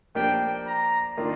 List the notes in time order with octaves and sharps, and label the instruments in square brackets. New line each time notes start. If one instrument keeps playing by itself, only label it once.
[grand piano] F3 A#3 D4 G4 [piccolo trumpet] G5
[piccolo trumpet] A#5
[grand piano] D#3 A#3 D4 F4